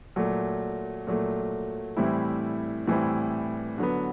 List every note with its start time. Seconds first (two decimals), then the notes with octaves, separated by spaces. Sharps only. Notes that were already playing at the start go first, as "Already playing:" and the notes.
0.16 A#2 F#3 A3
1.07 A#2 F#3 A3
1.97 A2 E3 G3 C4 E4
2.88 A2 E3 G3 C4 E4
3.78 D3 F#3 B3